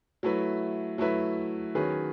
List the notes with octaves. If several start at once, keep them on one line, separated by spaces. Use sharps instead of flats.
F#3 A3 E4 B4
F#3 A3 E4 B4
D#3 F#3 C#4 G#4 B4